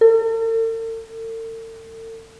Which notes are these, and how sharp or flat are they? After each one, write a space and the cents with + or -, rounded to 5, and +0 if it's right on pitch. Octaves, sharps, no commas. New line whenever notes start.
A4 +45